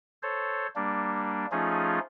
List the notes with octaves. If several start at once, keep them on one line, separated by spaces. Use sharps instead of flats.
A4 C5 C#5
G3 A#3 D4
F3 A3 C#4 D#4 F4 G#4